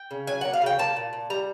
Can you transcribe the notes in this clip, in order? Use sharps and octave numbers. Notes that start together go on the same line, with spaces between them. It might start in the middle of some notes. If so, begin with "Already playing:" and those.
Already playing: G5
C#3
F#3 G#5
A#3 F#5
F5
C#3 G5
A#3 A5
A#2
A#2
G3 A#5